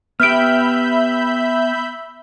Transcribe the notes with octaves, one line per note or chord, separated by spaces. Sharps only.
B3 G4 E5 B5 F6 G6 D7